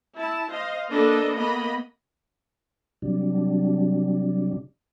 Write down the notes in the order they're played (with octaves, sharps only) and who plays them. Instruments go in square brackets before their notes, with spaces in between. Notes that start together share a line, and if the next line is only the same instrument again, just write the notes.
[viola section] E4 A5
C5 D#5 F5
A#3 D4 A4 B4 D#5
A#3 B3 D#5 B5
[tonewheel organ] C3 F#3 G3 D4